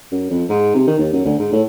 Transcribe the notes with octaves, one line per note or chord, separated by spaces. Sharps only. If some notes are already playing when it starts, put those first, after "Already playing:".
F#2
F2
G#2
C3
D#3
D#2
F#2
D2
G#2
A2